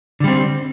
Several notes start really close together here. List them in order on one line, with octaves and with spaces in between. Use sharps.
D3 G3 C4